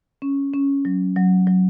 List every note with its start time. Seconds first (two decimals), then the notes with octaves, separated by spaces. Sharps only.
0.22 C#4
0.54 C#4
0.85 F#3
1.16 F#3
1.47 F#3